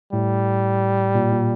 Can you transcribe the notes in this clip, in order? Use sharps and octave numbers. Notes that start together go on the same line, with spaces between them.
A2 G3
A#2
A#2